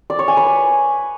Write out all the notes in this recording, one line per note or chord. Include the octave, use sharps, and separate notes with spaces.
D5
C#5
G#5
B4